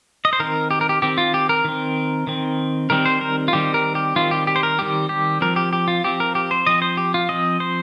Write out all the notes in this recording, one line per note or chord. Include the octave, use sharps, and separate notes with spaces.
D#5
C5
D#3 C4 A#4
G4
A#4
G4
D#3 C4 G4
F4
G4
A#4
D#3 C4
D#3 C4
D#3 G3 C4 A#4
C5
A#4
F4
D#3 G3 C4 G4
A#4
G4
D#3 G3 C4 F4
G4
G4
C5
A#4
D#3 G3 C4 G4
G4
F3 C4 A#4
G4
G4
F4
F3 C4 G4
A#4
G4
C5
F3 C4 D#5
C5
G4
F4
F3 C4 D#5
C5